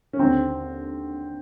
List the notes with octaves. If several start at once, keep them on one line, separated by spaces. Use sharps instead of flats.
C#4
D#2 D3 C4